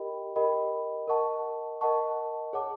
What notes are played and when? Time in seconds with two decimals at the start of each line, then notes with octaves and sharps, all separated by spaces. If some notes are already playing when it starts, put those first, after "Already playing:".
Already playing: G4 A#4 D#5 G5 B5
0.36 G4 A#4 D#5 G5 B5
1.08 A#4 D#5 F#5 A5 C#6
1.81 A#4 D#5 F#5 A5 C#6
2.53 G#4 C#5 F#5 A5 D6